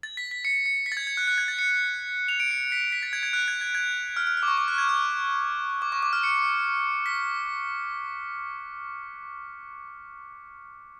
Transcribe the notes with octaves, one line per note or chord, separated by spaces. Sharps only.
A6
B6
B6
C#7
C#7
B6
A6
G#6
G#6
F#6
F#6
G#6
A6
C#7
F7
D7
C#7
B6
B6
A6
G#6
G#6
F#6
G#6
G#6
G#6
F6
F6
F6
D6
C#6
D6
F#6
G#6
F6
D6
C#6
D6
F6
C#7
B6